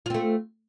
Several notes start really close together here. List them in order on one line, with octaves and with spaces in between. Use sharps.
F4 C4 A3